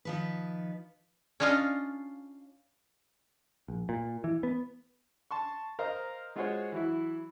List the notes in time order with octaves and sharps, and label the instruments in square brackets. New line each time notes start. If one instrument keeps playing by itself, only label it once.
[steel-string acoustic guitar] D#3 F3 B4
[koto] C#4 D4 F4 D#5 F5
[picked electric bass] A#1
A#2
E3
B3
[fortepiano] A5 C6 C#6
A#4 C5 D#5 F5 A#5
G#3 F4 F#4 G#4 C5 C#5
E3 F#3 E4